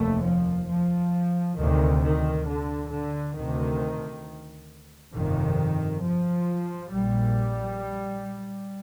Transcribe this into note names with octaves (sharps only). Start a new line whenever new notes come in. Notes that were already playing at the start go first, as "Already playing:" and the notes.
Already playing: F1 D#2 A3
F3
F3
D2 C3 D#3
D#3
D3
D3
D2 C3 D#3
G1 F2 C3 D#3
F3
A#1 A#2 G3